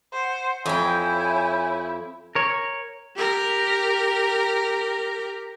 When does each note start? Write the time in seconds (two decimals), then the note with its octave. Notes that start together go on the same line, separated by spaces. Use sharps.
0.13 C5 F#5
0.66 F2 E4 C#5 G5 G#5 G6
2.35 A#4 C#5
3.16 G4 A#4